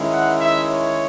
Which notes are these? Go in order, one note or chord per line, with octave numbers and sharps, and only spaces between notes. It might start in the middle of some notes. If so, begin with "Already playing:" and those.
Already playing: D#3 G#3 C#4 E4
F#5
E5
C#5